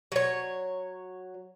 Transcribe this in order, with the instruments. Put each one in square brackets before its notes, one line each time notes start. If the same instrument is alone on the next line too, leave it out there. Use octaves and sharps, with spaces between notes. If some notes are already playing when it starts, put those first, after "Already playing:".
[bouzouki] F#3 C#5